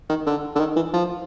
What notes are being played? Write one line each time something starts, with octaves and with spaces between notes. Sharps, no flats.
D#3
D3
D3
D#3
E3
F3